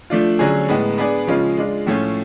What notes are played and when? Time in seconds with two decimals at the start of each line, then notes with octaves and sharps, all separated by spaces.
0.10 F3 A3 D4 F4
0.39 D3 F#3 C#4 G#4
0.69 A2 G#3 B3
0.98 B3 D4 G#4 D5
1.27 C#3 F3 G#3 C#4 F4
1.57 G#3 D4 F4
1.86 A2 F3 A3 C#4 F4